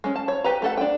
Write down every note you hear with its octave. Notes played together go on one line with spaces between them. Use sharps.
G#3 C#4
A5
C#5
G4 B4 A#5
A3 A4 F#5
D4 G5